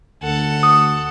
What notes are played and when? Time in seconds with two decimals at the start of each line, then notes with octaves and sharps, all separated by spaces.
0.23 D2 A4 F#5
0.63 D#6